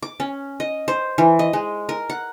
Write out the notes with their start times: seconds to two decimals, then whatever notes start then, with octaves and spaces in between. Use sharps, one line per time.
0.02 D6
0.20 C#4
0.60 D#5
0.88 C5
1.18 E3
1.39 D#5
1.53 G#3
1.89 A#4
2.10 F#5